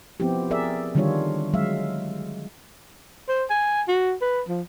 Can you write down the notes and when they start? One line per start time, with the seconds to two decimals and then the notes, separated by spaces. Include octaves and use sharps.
0.20 F3 B3 C4 E4 G4
0.51 G#4 A#4 D5 E5
0.95 D3 D#3 G3 D4 F4 C#5
1.54 F#3 G#3 E5 F5
3.29 C5
3.50 G#5
3.88 F#4
4.21 B4
4.49 F3